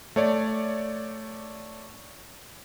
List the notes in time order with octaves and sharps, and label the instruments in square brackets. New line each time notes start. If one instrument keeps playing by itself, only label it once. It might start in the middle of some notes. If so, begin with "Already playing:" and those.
[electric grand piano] A3 C#5 D5